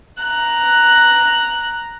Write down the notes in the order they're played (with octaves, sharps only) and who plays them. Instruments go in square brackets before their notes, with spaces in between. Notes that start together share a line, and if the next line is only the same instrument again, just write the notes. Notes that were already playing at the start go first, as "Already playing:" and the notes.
[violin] A#5 F#6